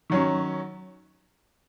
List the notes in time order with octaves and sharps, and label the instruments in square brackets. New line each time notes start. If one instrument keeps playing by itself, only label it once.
[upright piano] D#3 F#3 C#4